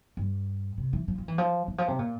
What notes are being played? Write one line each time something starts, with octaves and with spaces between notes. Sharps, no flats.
G2
C3
E3
F3
F3
E3
F3
E3
F3
C3
A#2